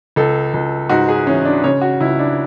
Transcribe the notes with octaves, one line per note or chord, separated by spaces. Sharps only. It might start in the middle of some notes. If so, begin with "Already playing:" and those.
C#2 A4
C#2
G#2 F#4
G#4
E3 C#4
D4
C#3 C#5
F#4
C#2 E4
D4